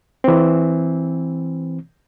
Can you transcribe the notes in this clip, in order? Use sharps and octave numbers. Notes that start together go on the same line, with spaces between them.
E3 C4